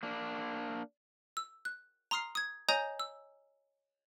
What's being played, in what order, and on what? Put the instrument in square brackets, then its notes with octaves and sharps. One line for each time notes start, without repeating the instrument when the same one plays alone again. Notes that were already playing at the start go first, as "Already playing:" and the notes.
[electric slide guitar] A#3 D4
[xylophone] E6
F#6
A#5 C6 D#6 F6 C7
D#6 G#6
C#5 D#5 G#5 A#5 D#6 G6
E6